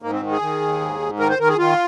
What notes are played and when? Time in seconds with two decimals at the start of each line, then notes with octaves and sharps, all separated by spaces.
0.02 G#2 A#3
0.13 C4
0.22 D#3
0.31 G#4
0.41 D#3
0.61 D#2
0.81 G#2
1.00 G#2
1.19 D#3 A#4
1.30 C5
1.39 D#3 A#4
1.48 G#4
1.58 D#3 F4